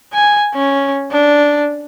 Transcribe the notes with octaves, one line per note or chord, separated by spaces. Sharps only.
G#5
C#4
D4